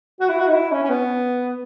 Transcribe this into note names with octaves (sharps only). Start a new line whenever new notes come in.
F#4
E4
F#4
D#4
E4
C#4
C#4
B3